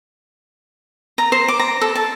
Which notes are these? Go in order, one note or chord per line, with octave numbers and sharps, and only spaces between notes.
A#5
C5
D6
A#5
A4
A5